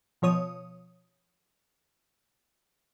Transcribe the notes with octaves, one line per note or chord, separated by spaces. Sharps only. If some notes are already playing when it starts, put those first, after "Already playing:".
B2 F3 C#5 D#6